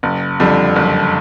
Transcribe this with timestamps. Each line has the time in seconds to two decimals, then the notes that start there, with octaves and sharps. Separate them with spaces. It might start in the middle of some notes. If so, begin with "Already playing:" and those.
0.03 F#1
0.40 F2 D3 G3
0.76 F#1